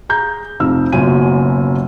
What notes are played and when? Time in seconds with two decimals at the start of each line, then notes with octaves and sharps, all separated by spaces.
0.09 G#4 A#5 G6
0.60 F1 F2 D#4 E6
0.92 F#1 F#2 B2 F4 G#5 D#7